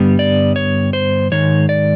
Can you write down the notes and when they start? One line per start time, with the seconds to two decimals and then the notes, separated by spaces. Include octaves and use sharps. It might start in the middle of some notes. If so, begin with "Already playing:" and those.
Already playing: G2 D3 G3 B3
0.19 D5
0.56 C#5
0.93 C5
1.32 G#2 D#3 G#3 D#4 C#5
1.69 D5